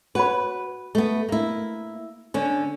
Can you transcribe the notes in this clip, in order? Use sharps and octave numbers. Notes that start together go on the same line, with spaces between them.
F#4 B4 C#5 B5
A3 B3
A#3 E4
D3 C#4 C#5